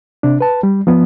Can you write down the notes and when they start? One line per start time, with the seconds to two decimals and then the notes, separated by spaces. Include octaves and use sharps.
0.23 C3 D4
0.40 B4 A5
0.63 G3
0.87 F3 B3